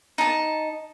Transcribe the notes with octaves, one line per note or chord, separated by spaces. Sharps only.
D#4 A5